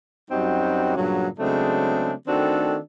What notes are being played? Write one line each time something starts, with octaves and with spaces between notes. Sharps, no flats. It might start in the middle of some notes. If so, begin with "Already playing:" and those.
F#2 F#3 G3 C4 D#4 F#4
G2 A#2 C#3 F#3
C#3 F#3 G#3 A3 C4 D4
D#3 A3 C4 D4 F#4 A4